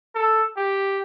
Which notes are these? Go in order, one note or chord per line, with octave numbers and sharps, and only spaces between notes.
A4
G4